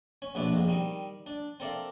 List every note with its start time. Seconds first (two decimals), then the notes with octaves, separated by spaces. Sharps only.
0.22 C#4
0.35 A#1 B2 D4 B4 E5 D6
0.53 F2 G#2
0.68 D#3 G3
1.26 D4
1.60 C4 A4 A#4 D5 E5 F5